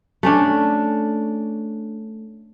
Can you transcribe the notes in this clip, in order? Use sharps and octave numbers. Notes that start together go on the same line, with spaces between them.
A3 C#4 D4